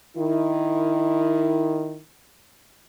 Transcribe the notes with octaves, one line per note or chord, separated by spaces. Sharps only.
D#3 E4